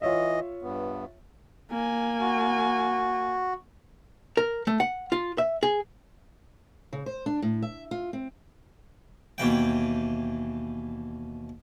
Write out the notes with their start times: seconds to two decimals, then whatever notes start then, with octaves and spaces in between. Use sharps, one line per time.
0.02 E3 F4 C#5 D#5 E5
0.62 G2 B3
1.71 A#3 G#5
2.20 F#4
4.37 A#4
4.67 A3
4.80 F#5
5.12 F4
5.38 E5
5.63 G#4
6.93 C#3
7.06 C5
7.26 D4
7.42 A2
7.63 E5
7.91 F4
8.13 C4
9.38 D#2 B2 E3 G5